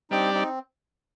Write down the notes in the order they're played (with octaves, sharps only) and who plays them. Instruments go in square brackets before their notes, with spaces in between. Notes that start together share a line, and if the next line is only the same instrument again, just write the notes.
[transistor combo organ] G3 D4 G4 D5 [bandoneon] C4 D#4
[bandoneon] C4 D#4